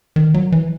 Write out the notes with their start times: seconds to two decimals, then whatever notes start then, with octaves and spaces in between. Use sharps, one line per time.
0.16 D#3
0.34 F#3
0.52 E3